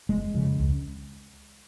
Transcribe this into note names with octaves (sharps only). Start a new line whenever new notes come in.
F1 G#3
F2 C#3
C#2